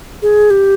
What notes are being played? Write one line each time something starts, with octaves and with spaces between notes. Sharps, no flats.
G#4
G4